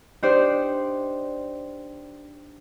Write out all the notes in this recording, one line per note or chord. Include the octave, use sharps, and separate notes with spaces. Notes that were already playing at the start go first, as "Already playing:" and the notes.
D4 D#4 G4 C5 D5